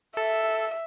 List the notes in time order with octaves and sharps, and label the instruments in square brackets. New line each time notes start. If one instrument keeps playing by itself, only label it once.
[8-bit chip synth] A4 [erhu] E5